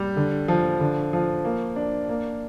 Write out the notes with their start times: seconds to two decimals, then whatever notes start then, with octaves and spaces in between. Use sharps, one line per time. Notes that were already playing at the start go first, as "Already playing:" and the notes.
Already playing: G3
0.16 D3
0.48 F3
0.80 D3
1.13 F3
1.45 A#3
1.76 D4
2.09 A#3